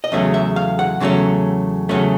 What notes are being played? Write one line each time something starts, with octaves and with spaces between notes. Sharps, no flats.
D#5
E2 C#3 F#3 A3 C#4 E5
E5
F5
F#5
E2 C#3 F#3 A3 C#4
E2 C#3 F#3 A3 C#4